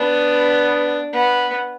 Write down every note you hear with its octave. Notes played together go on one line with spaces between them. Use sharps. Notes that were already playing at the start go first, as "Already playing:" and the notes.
Already playing: B3 D4
B3